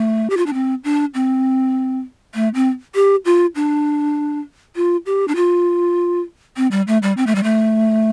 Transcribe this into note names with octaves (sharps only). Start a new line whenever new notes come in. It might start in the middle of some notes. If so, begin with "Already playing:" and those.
Already playing: A3
G4
F4
D4
C4
D4
C4
A3
C4
G4
F4
D4
F4
G4
D4
F4
C4
G3
A3
G3
C4
A3
G3
A3